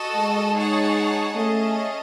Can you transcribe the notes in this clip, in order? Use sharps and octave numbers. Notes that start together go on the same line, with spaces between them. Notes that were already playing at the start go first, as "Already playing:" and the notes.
Already playing: F#4 A4 D#5 A5
G#3
D#4 G#4 C#5 F#5 A5
A3 C#4 G#4 D#5 A5